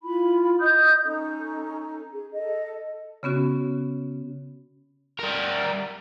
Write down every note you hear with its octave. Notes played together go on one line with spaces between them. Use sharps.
E4 F4 B5
D#5 D#6 G6
C#4 D#4 A4
G#4
A4 D#5
C#3 B3 C#4 F#4
G3 A#4